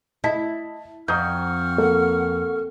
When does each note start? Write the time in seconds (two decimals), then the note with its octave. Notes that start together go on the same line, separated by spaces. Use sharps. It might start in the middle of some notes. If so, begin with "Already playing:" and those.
0.24 E4 D#5 A5 B6
1.08 F2 F#5 A#5 C#6 D#6 F6 G6
1.78 A#3 A4